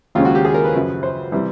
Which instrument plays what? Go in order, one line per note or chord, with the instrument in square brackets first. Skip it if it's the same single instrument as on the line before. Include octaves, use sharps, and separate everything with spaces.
[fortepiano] D#2 C#3 F3 G#3 C#4 F4
F#4
G4
G#4
A#4
B4
F#2 C#3 F3
C5
C3 E3 G3